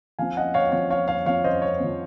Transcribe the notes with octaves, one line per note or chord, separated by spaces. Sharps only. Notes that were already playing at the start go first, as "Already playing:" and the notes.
F3 C4 F5 G#5
D#5 F#5
C#5 F5
F3 C4 C#5
C#5 F5
C#5 F5
F3 C4 C#5 F5
C5 D#5
C#5
F3 C4